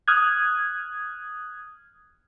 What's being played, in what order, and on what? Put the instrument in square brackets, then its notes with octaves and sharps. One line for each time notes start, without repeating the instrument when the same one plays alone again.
[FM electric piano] D#6 F6 F#6 G#6